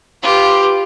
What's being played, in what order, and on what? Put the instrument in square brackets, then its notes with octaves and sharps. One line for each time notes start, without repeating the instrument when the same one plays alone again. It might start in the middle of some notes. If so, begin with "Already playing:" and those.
[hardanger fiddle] F4 B4 [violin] G4